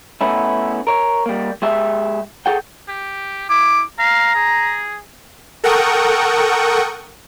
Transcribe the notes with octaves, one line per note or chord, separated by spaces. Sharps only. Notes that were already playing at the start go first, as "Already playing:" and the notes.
A3 B3 C#4 E4
A#4 C#5
G3 A#3
G#3 G4 E5
G#4 A4 F#5 G5
G4
E4 D6
F5 A#5
G#4
A4 A#4 F#5 G5 C#6 D#6